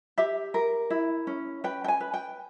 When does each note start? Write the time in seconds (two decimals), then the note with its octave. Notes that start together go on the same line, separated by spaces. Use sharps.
0.18 G4 E5
0.54 A#4
0.90 E4
1.27 C#4
1.64 B4 G5
1.84 G5
1.88 G#5
2.00 B4
2.14 G5